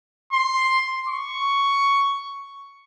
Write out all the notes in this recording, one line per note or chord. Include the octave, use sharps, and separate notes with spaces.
C6
C#6